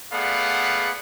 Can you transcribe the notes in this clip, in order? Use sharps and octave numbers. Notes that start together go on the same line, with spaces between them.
A3 B3 G#4 D5 F5 F#5